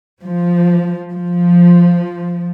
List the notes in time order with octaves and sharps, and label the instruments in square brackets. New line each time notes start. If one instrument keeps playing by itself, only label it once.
[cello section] F3
F3